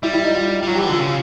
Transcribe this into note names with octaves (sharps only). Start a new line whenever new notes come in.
G3 E4
E4
D#4
F4
G3
F#3 F4
G4
E3
F#4
D3 F4
C#3